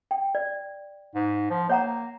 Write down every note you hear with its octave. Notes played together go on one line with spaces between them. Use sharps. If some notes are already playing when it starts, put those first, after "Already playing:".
G5
D5
G#2
F3
A#3 C#5 F#5 A#5